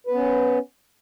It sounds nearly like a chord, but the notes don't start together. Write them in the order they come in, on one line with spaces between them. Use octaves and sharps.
B4 B3 C#4